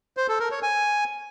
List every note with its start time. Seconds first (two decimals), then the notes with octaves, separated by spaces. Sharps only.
0.17 C5
0.28 A4
0.40 A#4
0.51 C#5
0.63 G#5